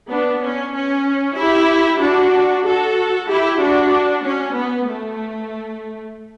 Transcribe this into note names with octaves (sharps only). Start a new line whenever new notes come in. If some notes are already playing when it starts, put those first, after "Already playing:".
B3 D4
C#4
C#4
E4 G4
D4 F#4
F#4 A4
E4 G4
D4 F#4
C#4
B3
A3